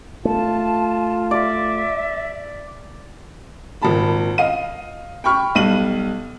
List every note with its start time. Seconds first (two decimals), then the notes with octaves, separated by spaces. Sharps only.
0.25 A3 F4 A5
1.31 D5 E5
3.82 G#1 A#2 A5 B5
4.38 D#5 F5 D#7
5.24 G5 B5 C#6 F6
5.55 B1 G3 D#7 F#7